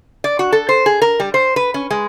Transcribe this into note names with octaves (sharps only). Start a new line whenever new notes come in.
D5
F#4
A4
C5
G#4
A#4
G3
C5
B4
C#4
G#3